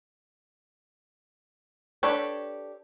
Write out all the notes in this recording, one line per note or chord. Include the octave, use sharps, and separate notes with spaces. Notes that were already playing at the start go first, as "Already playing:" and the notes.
D4 G4 A4 B4 C#5